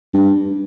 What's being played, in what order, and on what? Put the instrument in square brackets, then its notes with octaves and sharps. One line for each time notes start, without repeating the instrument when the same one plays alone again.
[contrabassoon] G2